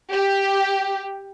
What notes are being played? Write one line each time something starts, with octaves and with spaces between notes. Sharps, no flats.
G4